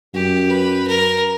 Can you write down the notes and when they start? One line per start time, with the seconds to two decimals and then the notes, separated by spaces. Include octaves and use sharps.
0.14 F#2 G4
0.50 B4
0.87 A#4